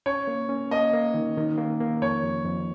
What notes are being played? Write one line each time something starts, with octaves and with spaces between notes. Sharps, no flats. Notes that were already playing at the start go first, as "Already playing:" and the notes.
C#4 C#5
A#3
C#4
A#3 D#5
A#3
D#3
D#3
A#3
A#3
F2 C#5
F2
F2